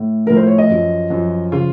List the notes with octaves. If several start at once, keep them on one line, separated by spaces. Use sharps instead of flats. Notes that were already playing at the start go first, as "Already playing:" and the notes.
Already playing: A2
A2 F3 A#4
C5
C#5
D#5
F#2 F3
F#2 F3
C#3 F3 F4